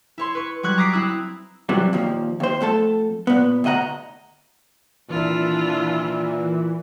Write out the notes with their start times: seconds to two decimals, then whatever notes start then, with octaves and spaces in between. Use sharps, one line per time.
0.18 E4 C#5 C6
0.35 B4 C#6
0.63 F#3 G3 C#6 F#6 G#6
0.78 A#5 D6 D#6 B6 C7 D7
0.93 C4 E4 D#6 F#6
1.69 C3 E3 F#3 G3
1.93 D#2 A#2 F3
2.40 D#2 C5
2.61 F2 A3 A4 A5
3.27 A#2 B3
3.64 D2 B2 D#5 F#5 A#5
5.10 A#2 D#3 E3 D4 E4 F4